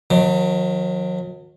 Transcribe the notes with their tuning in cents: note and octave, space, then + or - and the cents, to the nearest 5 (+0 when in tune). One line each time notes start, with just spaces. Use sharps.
D#3 +10 F#3 -40